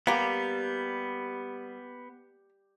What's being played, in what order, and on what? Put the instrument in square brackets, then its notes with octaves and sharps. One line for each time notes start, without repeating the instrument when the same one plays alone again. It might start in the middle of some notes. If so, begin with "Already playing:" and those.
[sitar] G3 [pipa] A#3 G4 [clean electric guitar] B3